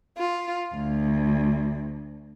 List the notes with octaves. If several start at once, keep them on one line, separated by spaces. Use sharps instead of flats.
F4
D2